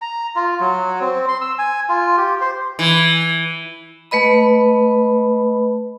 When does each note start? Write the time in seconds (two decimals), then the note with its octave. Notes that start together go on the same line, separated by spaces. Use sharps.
0.02 A#5
0.36 F4
0.60 F#3
1.01 C4
1.29 C6
1.41 E6
1.59 G#5
1.89 F4
2.17 G4
2.41 C5
2.79 E3
4.11 A3 B4 D#5 B5